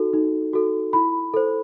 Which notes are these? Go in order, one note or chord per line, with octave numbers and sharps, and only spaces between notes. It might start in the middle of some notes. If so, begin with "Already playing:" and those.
Already playing: D#4 F#4 A4
D#4
F#4 A4
E4 B5
A4 C5